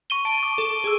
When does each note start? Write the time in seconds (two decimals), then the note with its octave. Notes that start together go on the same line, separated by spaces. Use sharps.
0.10 C#6 D#7 G7
0.25 A5 D7
0.43 D6
0.58 A4
0.84 G#4 E6